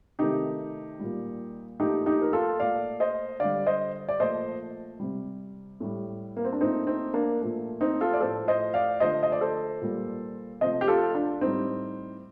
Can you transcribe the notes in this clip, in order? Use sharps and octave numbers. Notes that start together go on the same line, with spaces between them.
C3 D#3 A3 D#4 G4
A#2 G3
A#2 F3 A3 D#4 G4
D#4 G4
A#4
F4 A4
A#2 A3 D5 F5
C5 D#5
D3 G3 D5 F5
C5 D#5
D5
A#2 F3 A3 C5 D#5
C3 G3
A2 G3
A#3
C4
D4
A#2 A3 C4 D#4
C4 D#4
A#3 D4
A#2 F3 A3
C4 D#4
F4 A4
D5
A2 F3 A3 A4 C5
C5 D#5
D5 F5
D3 F3 A3 C5 D#5
D#5
D5
A4 C5
A#2 G3
C3 F3 A3 C5 D#5
G4
F4 A4
D4 F4
A2 G3 C4 D#4